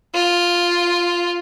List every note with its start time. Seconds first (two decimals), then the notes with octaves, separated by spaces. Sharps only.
0.15 F4